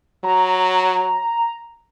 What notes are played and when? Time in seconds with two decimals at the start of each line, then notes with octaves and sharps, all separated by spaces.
0.24 F#3 A#5